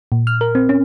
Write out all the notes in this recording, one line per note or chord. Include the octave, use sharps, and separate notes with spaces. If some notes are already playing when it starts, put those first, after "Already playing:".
A#2
F6
A#4
C4
C#4